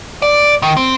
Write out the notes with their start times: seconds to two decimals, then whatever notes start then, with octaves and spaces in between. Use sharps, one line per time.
0.22 D5
0.62 D#3
0.77 C4